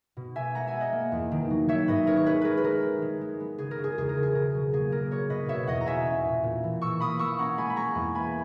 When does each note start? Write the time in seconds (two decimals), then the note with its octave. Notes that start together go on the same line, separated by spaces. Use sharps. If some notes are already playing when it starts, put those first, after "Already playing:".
0.17 B2
0.36 A#3 E5 G#5
0.55 G#3 F#5 A#5
0.67 E5 G#5
0.74 B3
0.80 D#5 F#5
0.93 A#3
1.12 E2
1.32 D#3
1.50 F#3
1.69 D#3 C#5 E5
1.88 G#2 B4 D#5
2.07 C#4 A#4 C#5
2.17 C#5
2.26 C#4 G#4 B4
2.41 G#3 A#4 B4
2.57 B4
2.64 G#3 A#4
2.83 D#3
3.02 G#3
3.21 G#3
3.40 B3
3.58 C#3 G#4
3.71 A#4
3.78 C#3
3.84 G#4
3.97 E2 G#4
4.09 A#4
4.17 C#3
4.23 G#4
4.35 B2 A#4
4.54 F#3
4.73 A#3 G#4
4.91 A#3 A#4
5.11 B2 A#4 C#5
5.29 B2 B4 D#5
5.48 B2 C#5 E5
5.67 E2 D#5 F#5
5.81 A#5
5.86 B2 E5 G#5
6.06 C#4
6.25 A#2
6.44 A#2
6.63 E3
6.81 E3 C#6 E6
7.00 A#3 B5 D#6
7.19 A#3 C#6 E6
7.39 C#4 F#5 A#5
7.58 G#3 G#5 B5
7.70 B5
7.76 G#3 A#5 C#6
7.95 E2
8.14 A#3 G#5 B5